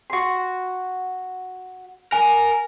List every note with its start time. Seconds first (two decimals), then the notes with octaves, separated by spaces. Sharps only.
0.10 F#4 C6
2.12 A#4 G#5